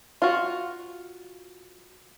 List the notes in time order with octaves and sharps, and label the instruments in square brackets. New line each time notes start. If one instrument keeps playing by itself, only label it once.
[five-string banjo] F4 F#4